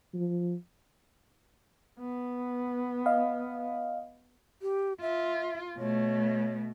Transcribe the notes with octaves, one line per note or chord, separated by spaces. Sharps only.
F3
B3
D#5 F5
G4
F4 E5
B2 A3 C#5